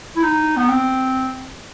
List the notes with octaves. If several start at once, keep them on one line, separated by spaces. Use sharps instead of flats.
E4
D#4
B3
C4